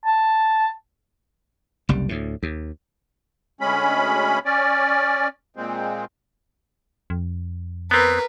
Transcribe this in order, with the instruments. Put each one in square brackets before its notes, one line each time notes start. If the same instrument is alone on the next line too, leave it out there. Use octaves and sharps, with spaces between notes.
[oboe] A5
[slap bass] F#1 C2 G3
D2 A2
D#2
[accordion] D2 G#3 C#4 B5
C#4 D5
A#2 G#3 C4
[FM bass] F2
[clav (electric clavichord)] B3 C4 [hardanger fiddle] A#4 B4